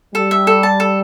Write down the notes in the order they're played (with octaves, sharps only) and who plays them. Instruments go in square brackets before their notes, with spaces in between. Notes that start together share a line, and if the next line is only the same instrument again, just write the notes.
[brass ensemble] G3 [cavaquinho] A4
[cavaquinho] E5
A4
A5
A4